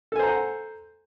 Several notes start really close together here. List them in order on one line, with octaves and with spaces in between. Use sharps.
A4 G#5 C5 A#5 F#5